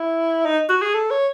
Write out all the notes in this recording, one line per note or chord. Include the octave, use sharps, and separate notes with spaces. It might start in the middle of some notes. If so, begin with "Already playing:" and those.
Already playing: E4
D#4
F#4
G#4
A4
C#5